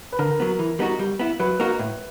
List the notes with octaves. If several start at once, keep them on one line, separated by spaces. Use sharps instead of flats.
B4
D3 A#4
F#3 B3
E3
G3 B3 D#4 F#4
G3
B3 E4
F#3 B4
A#3 D#4 F#4
A2